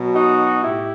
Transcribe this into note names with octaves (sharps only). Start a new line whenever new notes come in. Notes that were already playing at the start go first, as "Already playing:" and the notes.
Already playing: B2 F#3
D#4 F#4
A2 E4 G4